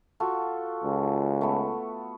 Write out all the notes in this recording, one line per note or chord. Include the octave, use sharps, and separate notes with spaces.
F4 F#4 A4
C#2
A3 B3